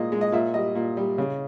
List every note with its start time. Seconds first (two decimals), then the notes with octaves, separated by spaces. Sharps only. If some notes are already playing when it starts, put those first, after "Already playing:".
Already playing: A#2 G#3 D#5
0.12 G#3
0.21 D#5
0.32 A#2 E5
0.54 G3 D#5
0.75 A#2
0.97 G3
1.18 C#3